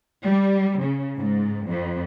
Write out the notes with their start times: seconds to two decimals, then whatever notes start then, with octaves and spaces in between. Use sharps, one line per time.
0.24 G3
0.80 C#3
1.18 G#2
1.68 F2